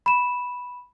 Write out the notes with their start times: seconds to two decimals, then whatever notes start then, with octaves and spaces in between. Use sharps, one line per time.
0.06 B5 E7